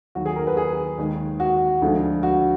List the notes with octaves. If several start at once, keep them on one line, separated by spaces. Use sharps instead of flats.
D#2 D#3 F#3 F#4
G#4
A#4
B4
G#4
D#2 D#3 G#3
F#4
D2 D3 F3 G#3
F#4